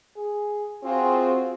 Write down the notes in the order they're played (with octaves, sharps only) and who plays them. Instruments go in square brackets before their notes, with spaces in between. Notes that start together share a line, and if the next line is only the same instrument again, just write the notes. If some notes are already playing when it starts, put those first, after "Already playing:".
[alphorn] G#4
[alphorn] C4 [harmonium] F4 F#4 G#4